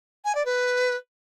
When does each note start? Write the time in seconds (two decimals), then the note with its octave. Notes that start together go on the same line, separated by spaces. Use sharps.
0.25 G#5
0.35 D5
0.45 B4